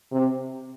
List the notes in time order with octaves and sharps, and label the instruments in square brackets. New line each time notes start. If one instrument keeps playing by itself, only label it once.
[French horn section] C3